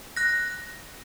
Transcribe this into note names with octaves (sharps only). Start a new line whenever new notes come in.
F#6 A#6